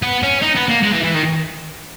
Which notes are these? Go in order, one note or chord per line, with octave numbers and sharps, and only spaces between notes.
B3
C#4
D#4
B3
A#3
G#3
E3
E3
D#3